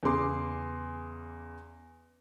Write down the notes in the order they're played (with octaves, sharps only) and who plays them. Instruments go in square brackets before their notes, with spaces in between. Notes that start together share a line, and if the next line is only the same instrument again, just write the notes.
[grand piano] E2 C#3 G#4 C6 D6